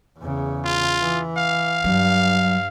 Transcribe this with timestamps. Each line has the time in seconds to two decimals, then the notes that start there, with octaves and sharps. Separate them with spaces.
0.19 E2 C#3
0.65 F4
1.00 E3
1.37 F5
1.84 G2 F#3